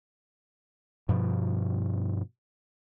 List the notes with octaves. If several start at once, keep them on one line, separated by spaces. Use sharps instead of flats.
G2 B2 F3